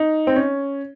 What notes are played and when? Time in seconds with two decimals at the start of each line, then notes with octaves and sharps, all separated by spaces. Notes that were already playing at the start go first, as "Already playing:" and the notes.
Already playing: D#4
0.27 C4
0.36 C#4